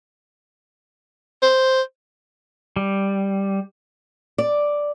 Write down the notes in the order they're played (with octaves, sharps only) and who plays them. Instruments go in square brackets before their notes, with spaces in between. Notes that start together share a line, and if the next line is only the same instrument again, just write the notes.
[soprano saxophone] C5
[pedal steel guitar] G3
[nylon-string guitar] D5